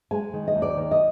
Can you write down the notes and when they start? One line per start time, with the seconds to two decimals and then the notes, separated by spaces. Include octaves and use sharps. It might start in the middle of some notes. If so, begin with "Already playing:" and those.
0.11 G#3 G#5
0.33 D#3
0.48 D#5
0.55 D#2
0.62 D5
0.77 D#3
0.91 D#5